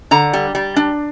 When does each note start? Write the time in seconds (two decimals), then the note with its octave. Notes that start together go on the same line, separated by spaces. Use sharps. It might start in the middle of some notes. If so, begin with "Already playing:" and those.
0.11 D3 A#5
0.33 G3
0.55 G3
0.76 D4